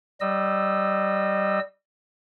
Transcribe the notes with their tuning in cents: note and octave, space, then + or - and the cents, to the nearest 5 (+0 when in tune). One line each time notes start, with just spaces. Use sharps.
G3 -20 D#5 -25 E6 -5